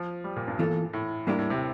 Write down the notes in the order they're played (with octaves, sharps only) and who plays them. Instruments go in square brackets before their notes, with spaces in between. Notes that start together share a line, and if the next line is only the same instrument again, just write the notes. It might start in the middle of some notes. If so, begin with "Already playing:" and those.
Already playing: [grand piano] F3
G3
A#2
G2
[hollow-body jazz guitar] E2 E3 A#3 F4 A4
[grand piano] A2
[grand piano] A2 [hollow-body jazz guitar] G3 A#3 D4 G4 A#4
[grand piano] A2
C3